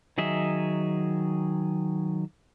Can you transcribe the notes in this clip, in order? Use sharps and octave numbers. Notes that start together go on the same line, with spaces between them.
D#3 F#3 G#4 D#5 E5